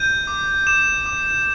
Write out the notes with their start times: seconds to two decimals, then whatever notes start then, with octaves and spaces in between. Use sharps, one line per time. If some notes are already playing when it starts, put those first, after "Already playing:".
Already playing: G6 D#7
0.27 D6
0.67 D6 E7
1.06 D6